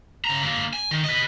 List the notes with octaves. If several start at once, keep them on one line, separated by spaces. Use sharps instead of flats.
C#3 A#5
D3 A#3
G#5
D#3
B4 D#5